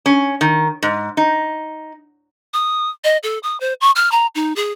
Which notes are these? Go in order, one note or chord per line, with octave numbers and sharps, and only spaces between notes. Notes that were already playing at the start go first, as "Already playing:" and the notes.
C#4
D#3
G#2
D#4
D#6
D#5
A4
D#6
C5
C#6
F6
A#5
D#4
G#4